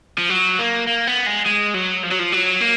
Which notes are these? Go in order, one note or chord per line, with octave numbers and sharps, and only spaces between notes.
F3
F#3
A#3
A#3
B3
G#3
G#3
F#3
F3
F#3
F3
F#3
A#3